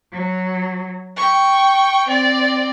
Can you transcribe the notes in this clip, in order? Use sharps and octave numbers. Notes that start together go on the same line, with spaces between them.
F#3
G5 C#6
C4 D5